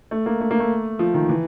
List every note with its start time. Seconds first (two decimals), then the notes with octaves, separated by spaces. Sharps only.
0.11 A3
0.26 A#3
0.40 A3
0.51 A#3
0.60 A3
0.99 F3
1.14 D#3
1.29 E3